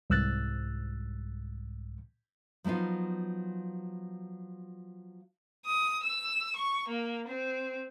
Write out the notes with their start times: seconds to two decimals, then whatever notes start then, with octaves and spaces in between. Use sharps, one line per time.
0.10 C2 G#2 E6 F#6 A6
2.64 F3 F#3 B3 D#4 F4
5.65 D#6
6.03 E6
6.56 C#6
6.88 A#3
7.28 C4